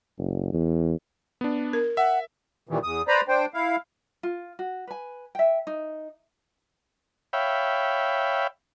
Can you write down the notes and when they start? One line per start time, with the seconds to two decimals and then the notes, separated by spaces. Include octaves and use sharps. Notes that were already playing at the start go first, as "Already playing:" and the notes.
0.18 F#1
0.53 E2
1.41 B3 D4
1.73 A#4
1.97 E5 F#5
2.69 A#2 D#3 E3 G3
2.83 E2 D#6
3.08 B4 C5 D5 A#5 B5
3.28 D4 C5 G5
3.54 E4 F5
4.23 F4
4.59 F#4
4.87 B4 G#5
5.35 E5 G5
5.67 D#4
7.33 C#5 E5 F5 G5 B5